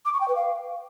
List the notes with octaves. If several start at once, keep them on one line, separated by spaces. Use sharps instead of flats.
D6
C#6
G5
B4
F5